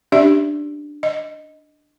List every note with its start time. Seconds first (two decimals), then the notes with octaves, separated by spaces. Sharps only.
0.12 C#4 D4 G4 D5 E5
1.03 D#5